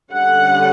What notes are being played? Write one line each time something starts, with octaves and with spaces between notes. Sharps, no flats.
D3 G3 C#4 F#5